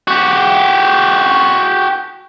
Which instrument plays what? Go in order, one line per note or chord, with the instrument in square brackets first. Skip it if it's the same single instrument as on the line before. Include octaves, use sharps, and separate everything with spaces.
[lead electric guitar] F#4 G4